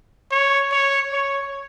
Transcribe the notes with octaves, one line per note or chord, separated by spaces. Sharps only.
C#5
C#5
C#5